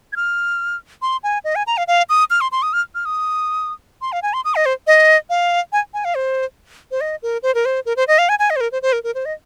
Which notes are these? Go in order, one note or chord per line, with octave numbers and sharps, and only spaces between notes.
G#6
F6
C6
G#5
D#5
G#5
A#5
F5
F5
D#6
F6
C6
C6
D#6
F6
F6
D#6
C6
F5
G#5
C6
D#6
D#5
C5
D#5
F5
G#5
G#5
F5
C5
C5
D#5
A#4
C5
A#4
C5
A#4
C5
D#5
F5
G#5
G#5
D#5
C5
A#4
C5
C5
A#4
A#4
C5
D#5